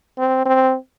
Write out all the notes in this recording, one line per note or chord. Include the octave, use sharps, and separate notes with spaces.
C4
C4